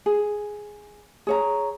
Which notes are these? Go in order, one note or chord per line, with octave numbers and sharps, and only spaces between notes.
G#4
G#4 C#5 A#5